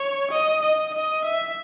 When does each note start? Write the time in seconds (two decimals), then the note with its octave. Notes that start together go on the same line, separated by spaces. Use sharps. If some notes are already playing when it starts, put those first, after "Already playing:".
Already playing: C#5
0.32 D#5
0.63 D#5
0.94 D#5
1.25 E5